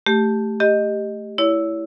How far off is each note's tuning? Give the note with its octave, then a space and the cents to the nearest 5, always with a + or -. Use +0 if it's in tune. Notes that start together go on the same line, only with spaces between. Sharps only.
A3 +0 G4 +0
G4 +10 D#5 -5
E4 +0 C#5 +35